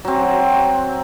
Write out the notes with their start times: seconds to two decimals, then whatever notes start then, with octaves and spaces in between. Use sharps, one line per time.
0.05 F#3 C4